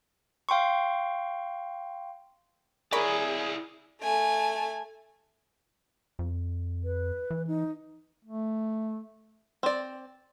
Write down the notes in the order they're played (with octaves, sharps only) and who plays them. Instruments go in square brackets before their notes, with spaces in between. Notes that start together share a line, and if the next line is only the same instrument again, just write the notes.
[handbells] F5 G5 C6 C#6
[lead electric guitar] E4 D5 [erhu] G#4 [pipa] A#4 C#5 B5
[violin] A3 G#5
[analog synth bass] F2
[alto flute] B4
[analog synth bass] E3
[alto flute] D#4
[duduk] A3
[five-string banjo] C4 D5